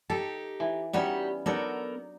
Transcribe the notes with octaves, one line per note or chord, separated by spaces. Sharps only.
D#4 G4 A4
E3
G3 B3 C#4 D#4 F#4 G4
F#3 B3 D4 D#4 A4 A#4